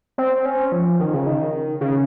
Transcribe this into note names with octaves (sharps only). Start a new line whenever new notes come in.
C4
C#4
F3
D#3
C#3
D#3
C#3